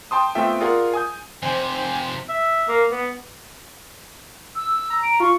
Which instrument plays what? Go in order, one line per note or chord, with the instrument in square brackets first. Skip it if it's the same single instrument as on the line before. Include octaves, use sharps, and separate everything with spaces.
[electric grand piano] G5 A5 C6 D#6
A3 B3 C4 F4 E5 G5
F4 G#4 A#4 D5 F5 F#5
G#5 D#6 G6
[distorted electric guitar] F2 C3 [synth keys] C5 [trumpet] G5 [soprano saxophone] G#5
[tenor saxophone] E5
A#3
B3
[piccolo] E6
[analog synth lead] A#5
[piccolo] D7
[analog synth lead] F4 [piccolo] C#6